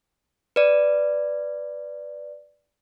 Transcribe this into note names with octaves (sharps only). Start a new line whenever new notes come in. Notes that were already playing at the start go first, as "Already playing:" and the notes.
B4 D5